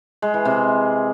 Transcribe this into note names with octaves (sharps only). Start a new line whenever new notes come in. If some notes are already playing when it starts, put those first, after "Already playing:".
G#3
E3
C3